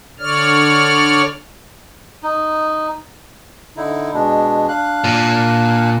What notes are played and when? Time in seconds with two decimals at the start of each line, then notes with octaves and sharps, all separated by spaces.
0.20 D3 C#5 D5 F6
2.23 D#4
3.77 D3 D#4 E4
4.14 B2 G#3 D4
4.68 D4 F5 F#6
5.04 A#2